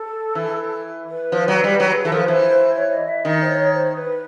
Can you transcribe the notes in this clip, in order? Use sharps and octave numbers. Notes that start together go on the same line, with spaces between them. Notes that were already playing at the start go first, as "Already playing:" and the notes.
Already playing: A4
E3
B4
F3
F#3
G3
F#3
G#4
E3 A4
F3 A#4
B4
E3 C5
C#5
D#5
E5
D#3 D#5
C5
C#5
C5
B4